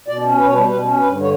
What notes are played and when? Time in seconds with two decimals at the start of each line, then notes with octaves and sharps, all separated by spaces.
0.08 B2 D5
0.23 C#4
0.38 B2 B4
0.46 C#5
0.53 G3 B4
0.68 B2 B4
0.83 C#4
0.99 G2 B4
1.14 D3
1.21 C#5